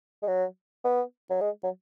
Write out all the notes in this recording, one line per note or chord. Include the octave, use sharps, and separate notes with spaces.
G#3
F#3
B3
F#3
G#3
F#3